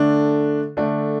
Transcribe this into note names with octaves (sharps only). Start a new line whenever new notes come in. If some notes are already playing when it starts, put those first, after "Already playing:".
Already playing: D3 A3 D4
D3 A3 D4